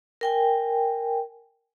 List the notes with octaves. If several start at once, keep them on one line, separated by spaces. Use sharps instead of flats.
A#4 G5 G#5